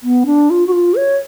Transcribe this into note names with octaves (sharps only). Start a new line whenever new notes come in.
B3
D4
F4
F#4
F4
C#5